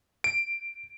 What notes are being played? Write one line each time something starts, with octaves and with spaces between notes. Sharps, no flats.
D7